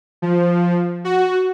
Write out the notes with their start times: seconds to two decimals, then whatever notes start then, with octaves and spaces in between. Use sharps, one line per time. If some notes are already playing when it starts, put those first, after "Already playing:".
0.22 F3
1.05 F#4